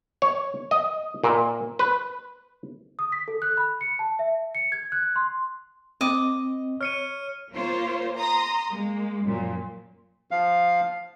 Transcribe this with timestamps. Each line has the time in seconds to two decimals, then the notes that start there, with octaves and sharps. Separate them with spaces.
0.22 C#5
0.71 D#5
1.24 A#2
1.79 B4
2.99 D#6
3.12 B6
3.28 A4
3.42 F#6
3.57 B5
3.81 C#7
3.99 A5
4.19 E5
4.55 C#7
4.72 G#6
4.92 F#6
5.16 C6
6.01 C4 D#5 D6
6.81 C#5 F6 C#7 D#7
7.53 A#3 F4 C5 C#5
8.17 A#5 C6 D#6
8.71 G#3 A#3
9.24 F#2 A#2 F3
10.31 F3 F5